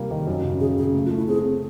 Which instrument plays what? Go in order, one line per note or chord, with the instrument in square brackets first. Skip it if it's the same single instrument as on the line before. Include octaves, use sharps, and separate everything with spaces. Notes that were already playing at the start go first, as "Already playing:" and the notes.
Already playing: [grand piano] C3 G3 A#3
D#3
F#2
C#3
[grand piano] C#3 [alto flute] G#4
[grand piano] C#3 [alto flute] G#4
[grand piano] A3
[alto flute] F4
[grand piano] A3
[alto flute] E4
[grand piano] C4 [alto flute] G#4
[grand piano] C4